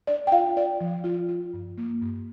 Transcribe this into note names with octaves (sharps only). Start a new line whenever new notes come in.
D4 D5
G5
F4 F5
F4 D5
F3
F4
F4
G2
A#3
G2